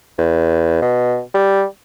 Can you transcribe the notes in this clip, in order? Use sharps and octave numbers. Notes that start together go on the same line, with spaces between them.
E2
B2
G3